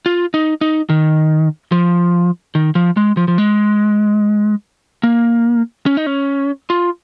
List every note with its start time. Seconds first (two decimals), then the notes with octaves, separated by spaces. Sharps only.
0.06 F4
0.34 D#4
0.61 D#4
0.89 D#3
1.72 F3
2.55 D#3
2.75 F3
2.97 G#3
3.17 F3
3.28 F3
3.38 G#3
5.03 A#3
5.86 C#4
5.97 D#4
6.06 C#4
6.70 F4